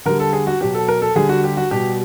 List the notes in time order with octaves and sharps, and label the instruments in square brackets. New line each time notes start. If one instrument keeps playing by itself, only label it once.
[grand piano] D3 G3 A#4
A4
G#4
F#4
B2 F#3 G4
A4
A#4
A4
D3 G3 G#4
F#4
G4
F#4
B2 G3 G4